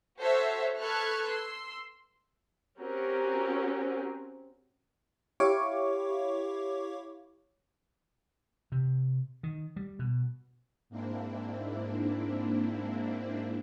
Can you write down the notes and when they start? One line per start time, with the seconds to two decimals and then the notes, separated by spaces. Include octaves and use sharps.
0.18 F#4 A4 C5 C#5 E5
0.80 A4 B4 C#6 F6 F#6 G#6
1.29 C6 E6
2.79 C4 C#4 F#4 G4 A#4
5.40 E4 G4 C#5 F5 C#6 D6
8.72 C3
9.43 D#3
9.76 G3
9.99 B2
10.89 G#2 A#3 C4 D4 E4